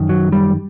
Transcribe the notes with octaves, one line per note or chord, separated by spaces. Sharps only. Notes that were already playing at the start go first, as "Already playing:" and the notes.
Already playing: F#2 D#3
F#3
G3